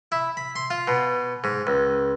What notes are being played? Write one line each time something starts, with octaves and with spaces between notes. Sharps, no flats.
E4
B5
C6
F4
B2
G#2
C#2